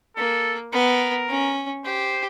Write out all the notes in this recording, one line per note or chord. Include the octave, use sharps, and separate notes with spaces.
A#3 A4
B3 A#4
C#4
G4 C5